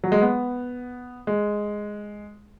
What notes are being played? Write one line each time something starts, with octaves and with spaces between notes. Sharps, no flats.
F#3
G#3
B3
G#3